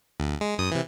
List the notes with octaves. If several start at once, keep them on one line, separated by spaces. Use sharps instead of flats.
D2
G#3
F#2 D#6
C3 E3